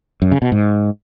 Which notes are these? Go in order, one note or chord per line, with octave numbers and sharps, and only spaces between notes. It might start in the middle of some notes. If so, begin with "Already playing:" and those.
F#2
C#3
B2
G#2